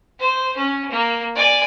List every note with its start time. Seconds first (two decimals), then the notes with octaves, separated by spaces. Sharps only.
0.19 C5
0.57 C#4
0.91 A#3
1.36 D5 G#5